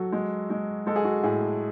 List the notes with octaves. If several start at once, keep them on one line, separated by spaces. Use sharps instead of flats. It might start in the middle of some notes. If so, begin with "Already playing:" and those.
Already playing: F#3 F#4 A4
G#3
G#3
G#3 A4
G#4
F#4 A4
A2 G#4